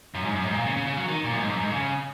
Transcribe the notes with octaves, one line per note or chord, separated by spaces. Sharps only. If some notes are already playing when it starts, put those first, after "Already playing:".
F#2
G#2
F#2
G#2
A#2
C#3
C#3
C#3
F#3
D#3
A#2
F#2
G#2
F#2
G#2
C#3